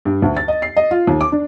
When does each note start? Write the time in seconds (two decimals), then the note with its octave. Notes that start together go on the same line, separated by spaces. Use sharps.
0.05 G2
0.22 D2
0.37 A6
0.48 D#5
0.62 C7
0.76 D#5
0.91 F4
1.07 D#2
1.21 D6
1.32 D4